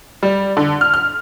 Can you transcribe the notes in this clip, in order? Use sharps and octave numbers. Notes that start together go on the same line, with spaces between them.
G3
D3
F6
F6